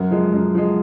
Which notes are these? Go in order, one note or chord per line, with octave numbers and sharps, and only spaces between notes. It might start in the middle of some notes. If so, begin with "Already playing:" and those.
Already playing: F#2 F#4 A#4
F3 G#3
F#2
F3 G#3